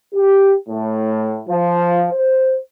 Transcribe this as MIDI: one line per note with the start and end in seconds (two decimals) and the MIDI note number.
0.14 0.54 67
0.69 1.40 45
1.48 2.05 53
2.12 2.56 72